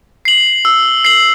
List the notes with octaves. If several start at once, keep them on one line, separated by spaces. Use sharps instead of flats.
C7 F#7
E6
C7 F#7